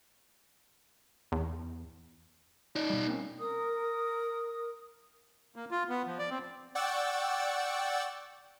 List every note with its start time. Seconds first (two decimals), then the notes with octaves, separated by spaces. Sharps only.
1.32 E2
2.76 D#4 D5
2.90 B2 G3
3.08 A#3 C4 C#4
3.39 A#4 D#6
5.56 A#3
5.71 F4
5.89 B3
6.07 F3
6.19 D5
6.30 C4
6.75 D5 F#5 G5 C#6 E6 A6